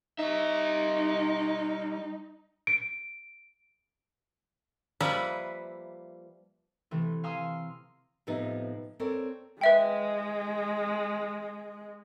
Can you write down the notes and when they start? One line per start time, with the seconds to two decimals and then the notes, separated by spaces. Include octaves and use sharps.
0.19 G3 D#4 E5
2.67 D7
5.00 F3 G3 A#3 B4 E5
6.91 C3 E3 A3
7.24 F5 G#5 A#5 C6 D#6 E6
8.27 A2 C3 F3 B3 D#4
9.00 C4 A4 A#4 C#5 D5
9.61 G#3 B4 E5 G5